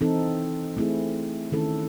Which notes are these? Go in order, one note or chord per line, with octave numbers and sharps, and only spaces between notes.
E3 C4 D#4 A4
A3 C4 E4 G#4
D#3 A3 C#4 E4 A4